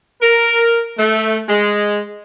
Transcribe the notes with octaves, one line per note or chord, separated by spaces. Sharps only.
A#4
A3
G#3